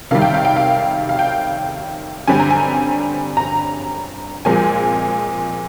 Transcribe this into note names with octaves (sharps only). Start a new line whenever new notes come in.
C3 D#3 G3 F5
G5
F5
G5
F5
F5
G5
G2 D3 G3 C4 G#5
A#5
G#5
A#5
A#2 F3 G#3 C4 G#5